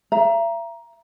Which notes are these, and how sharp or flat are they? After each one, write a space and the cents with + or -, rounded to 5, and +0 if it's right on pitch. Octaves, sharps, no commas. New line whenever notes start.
E5 +40 A#5 +10